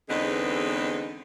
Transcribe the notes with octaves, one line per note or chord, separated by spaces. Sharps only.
E2 D3 G#3 B3 C4 D#4